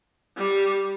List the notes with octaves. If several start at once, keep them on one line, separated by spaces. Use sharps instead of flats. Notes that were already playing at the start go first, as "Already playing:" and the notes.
G3